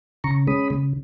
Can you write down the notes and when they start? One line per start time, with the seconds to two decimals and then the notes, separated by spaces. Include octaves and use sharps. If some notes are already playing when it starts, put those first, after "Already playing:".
0.24 C#3 A#5 C#6
0.47 G#3 C#4 B5 D#6
0.70 C#3